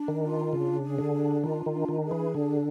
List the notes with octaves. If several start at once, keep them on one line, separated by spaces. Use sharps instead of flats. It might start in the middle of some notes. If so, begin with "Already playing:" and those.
Already playing: D4
D#3
F4
C#3 D4
G#4
D3
D4
D#3 F4
D#3
D4
D#3
G#4
E3
D3 D4